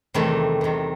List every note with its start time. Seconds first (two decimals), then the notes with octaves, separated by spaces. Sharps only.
0.14 E2 C3 D#3 G3 A3
0.61 E2 C3 D#3